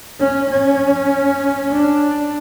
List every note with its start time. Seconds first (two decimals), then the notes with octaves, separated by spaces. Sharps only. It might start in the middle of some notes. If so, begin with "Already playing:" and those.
0.20 C#4
0.50 C#4
1.72 D4